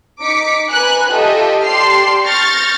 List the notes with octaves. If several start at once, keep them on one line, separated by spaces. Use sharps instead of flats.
D#4 D6 B6 C#7
B4 G#5 A#5 F#6
F4 G4 A4 D#5 E5
G4 D5 A5 C6 F6 C7
C#6 F6 G6 A6 A#6